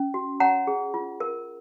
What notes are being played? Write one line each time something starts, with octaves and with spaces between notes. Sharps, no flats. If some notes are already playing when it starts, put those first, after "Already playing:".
Already playing: C#4
F#4
C#5 F#5 A#5
G#4
F4
A#4